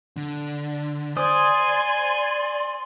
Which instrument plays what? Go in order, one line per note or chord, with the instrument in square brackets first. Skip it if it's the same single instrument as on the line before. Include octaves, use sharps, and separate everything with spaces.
[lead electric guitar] D3
[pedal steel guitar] C5 D#6 [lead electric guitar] D5 [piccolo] G#5 [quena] C6